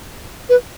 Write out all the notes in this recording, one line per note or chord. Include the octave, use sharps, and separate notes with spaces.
B4